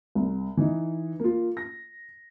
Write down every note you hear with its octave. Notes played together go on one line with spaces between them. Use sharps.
C2
E3 D#4
A#3 F4
A#6